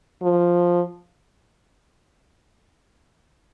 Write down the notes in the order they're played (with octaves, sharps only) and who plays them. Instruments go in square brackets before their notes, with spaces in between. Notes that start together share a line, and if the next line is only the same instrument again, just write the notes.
[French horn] F3